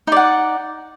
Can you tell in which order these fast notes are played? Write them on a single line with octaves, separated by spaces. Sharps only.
D#4 D5 F#5